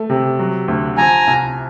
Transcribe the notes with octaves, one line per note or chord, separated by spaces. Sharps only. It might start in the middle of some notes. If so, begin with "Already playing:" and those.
Already playing: A3
C3
F#3
D2
F3 G#5 A#5
C2